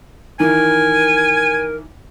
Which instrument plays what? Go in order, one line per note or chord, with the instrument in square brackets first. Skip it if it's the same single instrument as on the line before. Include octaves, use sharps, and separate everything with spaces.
[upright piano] D#3 E3 [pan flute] A#4 [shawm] G#5